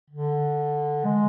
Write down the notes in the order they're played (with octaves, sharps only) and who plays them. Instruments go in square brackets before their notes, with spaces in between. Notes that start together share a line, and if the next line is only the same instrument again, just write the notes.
[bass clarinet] D3
G#3